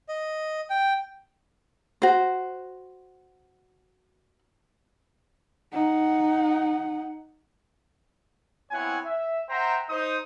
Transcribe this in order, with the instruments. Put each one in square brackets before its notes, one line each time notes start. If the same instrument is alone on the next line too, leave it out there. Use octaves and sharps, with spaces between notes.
[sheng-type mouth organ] D#5
G5
[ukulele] F#4 C5
[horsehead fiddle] D#4 F#5
[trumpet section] B3 C4 E4 C#5 F#5 G#5
E5
C5 E5 F#5 G5 A#5
D#4 C5 D#6